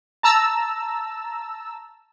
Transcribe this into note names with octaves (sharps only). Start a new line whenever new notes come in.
A5 A#5 E6